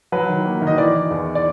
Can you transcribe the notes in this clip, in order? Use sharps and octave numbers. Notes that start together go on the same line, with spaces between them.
F#3 B4
D#3
A#3
D#3
D#5
E3 D5
E3
E2
D5